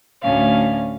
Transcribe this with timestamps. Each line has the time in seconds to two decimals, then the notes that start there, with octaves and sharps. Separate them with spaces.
0.23 D2 A2 C#4 F5